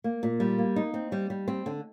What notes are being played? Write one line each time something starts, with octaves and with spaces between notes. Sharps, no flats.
A#3
A#2
G3
A#3
D#4
C4
G3
G3
C4
D3